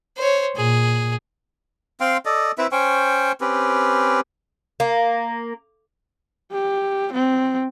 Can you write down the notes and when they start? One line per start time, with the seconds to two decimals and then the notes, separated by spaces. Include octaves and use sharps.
0.18 C5 C#5
0.56 A#2 G#4
2.00 C4 F5 G5 C6
2.25 A4 D5 D#5
2.58 C4 E4 B4 E5
2.72 C#4 C5 G5 C#6
3.41 C4 C#4 G4 B4
4.80 A#3
6.52 G4
7.13 C4